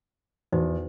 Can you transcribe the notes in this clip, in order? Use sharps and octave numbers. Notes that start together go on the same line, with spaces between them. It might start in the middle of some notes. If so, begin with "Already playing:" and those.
E2 D#4 F#4 C5